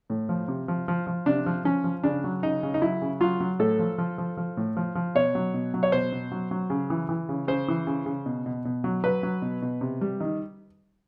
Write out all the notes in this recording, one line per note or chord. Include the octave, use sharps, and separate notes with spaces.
A2
F3
C3
F3
F3
F3
C3 D4
F3
F3 C#4
F3
C#3 D4
F#3
C#3 D#4
C#3
D#4
F#3 E4
C#3
F#3 F4
F#3
A2 A4
F3
F3
F3
F3
A2
F3
F3
B2 C#5
F#3
B2
F#3
C#5
B2 C5
B2
F#3
F#3
C#3
E3
E3
C#3
C#3 C5
E3
C#3
C#3
B2
B2
B2
F#3
F#3 B4
F#3
B2
B2
C3
G3
D#3